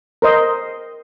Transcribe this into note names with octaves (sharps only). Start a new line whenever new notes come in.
A#4 C5 D#5